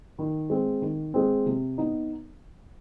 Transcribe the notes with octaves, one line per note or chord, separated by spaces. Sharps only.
D#3
G#3 C4
D#3
G#3 C4
C3
B3 D#4